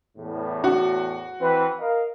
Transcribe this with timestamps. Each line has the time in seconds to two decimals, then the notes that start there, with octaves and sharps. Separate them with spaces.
0.18 E2 A2
0.64 F#4
1.41 E3 C4 B4
1.79 A#4 D#5 F5